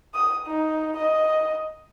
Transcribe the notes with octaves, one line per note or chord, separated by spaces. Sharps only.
D#6
D#4
D#5